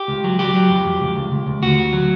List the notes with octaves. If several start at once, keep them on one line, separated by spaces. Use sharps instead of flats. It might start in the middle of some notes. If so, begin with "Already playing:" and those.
Already playing: G4
C#2
F#3
F#3 G4
F#3
F2
F2
C#2
C#2
C#2
C#2
D2 F#4
D2
F#3